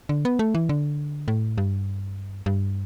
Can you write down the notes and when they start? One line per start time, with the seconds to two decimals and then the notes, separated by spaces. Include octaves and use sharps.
0.09 D3
0.25 B3
0.39 A3
0.55 E3
0.69 D3
1.28 A2
1.58 G2
2.46 G2